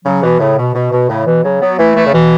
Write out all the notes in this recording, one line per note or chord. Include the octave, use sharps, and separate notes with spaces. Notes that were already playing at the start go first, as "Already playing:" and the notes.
C#3 F#3
B2 E3
A2 C#3
B2
B2
B2
A2 C#3
B2 E3
C#3 F#3
F#3 B3
E3 A3
E3 A3
C#3
B2 E3